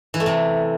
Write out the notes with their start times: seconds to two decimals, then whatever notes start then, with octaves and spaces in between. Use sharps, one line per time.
0.14 E3
0.20 A3
0.26 C3